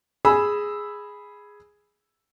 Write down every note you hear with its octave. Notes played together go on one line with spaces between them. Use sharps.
G#4 B5 E6